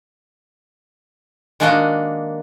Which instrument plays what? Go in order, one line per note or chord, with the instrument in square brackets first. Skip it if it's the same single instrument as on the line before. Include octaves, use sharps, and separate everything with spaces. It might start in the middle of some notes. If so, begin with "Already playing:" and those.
[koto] D#3 G#3 A#3 D4 F#4 D#5